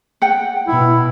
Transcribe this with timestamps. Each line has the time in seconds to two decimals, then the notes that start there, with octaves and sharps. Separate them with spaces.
0.22 F#5 G5
0.68 B2 E4